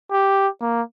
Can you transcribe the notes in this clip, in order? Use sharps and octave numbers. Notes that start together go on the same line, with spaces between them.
G4
A#3